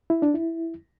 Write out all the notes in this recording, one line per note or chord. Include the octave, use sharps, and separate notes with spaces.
E4
D4
E4